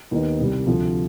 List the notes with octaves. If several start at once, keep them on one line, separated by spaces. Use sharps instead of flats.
D#2 D#3 B3 D#4
C2 C3 G3
D2 C3 F3